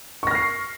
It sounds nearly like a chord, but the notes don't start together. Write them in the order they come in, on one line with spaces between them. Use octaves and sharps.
C#6 A#6 F6 C7